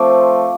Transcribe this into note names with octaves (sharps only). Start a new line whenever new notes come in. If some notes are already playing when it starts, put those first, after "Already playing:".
Already playing: F3 A3 C4 D6